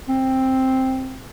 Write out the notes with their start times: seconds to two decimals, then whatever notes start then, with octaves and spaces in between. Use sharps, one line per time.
0.09 C4